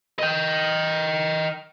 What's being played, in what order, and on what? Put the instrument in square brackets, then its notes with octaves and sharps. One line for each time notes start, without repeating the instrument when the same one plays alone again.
[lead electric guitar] D#5 G5